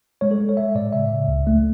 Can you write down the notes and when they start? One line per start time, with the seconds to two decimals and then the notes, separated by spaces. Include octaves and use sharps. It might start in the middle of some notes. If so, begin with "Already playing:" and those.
0.21 G#3 C#5
0.31 A4
0.39 G#3
0.49 C#5
0.57 G#3 E5
0.75 A2 D5
0.93 C#3 E5
1.11 C#3
1.28 C#2
1.47 A3